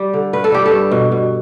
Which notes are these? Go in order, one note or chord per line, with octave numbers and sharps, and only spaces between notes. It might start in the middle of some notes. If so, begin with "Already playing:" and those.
Already playing: G3 G4
D3
G2 B4
A4
G3 G4
A4
G2
B2
B2